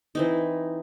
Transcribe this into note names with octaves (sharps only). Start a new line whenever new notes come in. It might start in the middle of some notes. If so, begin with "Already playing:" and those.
E3 C4 D#4